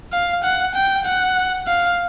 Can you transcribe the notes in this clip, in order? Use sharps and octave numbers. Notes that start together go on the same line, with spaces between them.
F5
F#5
G5
F#5
F5